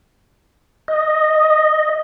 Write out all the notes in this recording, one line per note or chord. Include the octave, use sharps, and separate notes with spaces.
D#5